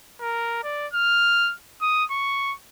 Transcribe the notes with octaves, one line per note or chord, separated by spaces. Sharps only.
A#4
D5
F6
D#6
C#6